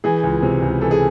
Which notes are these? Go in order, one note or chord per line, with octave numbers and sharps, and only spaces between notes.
E3 G#4
C#2
C3
C#2
E3 A4
G#4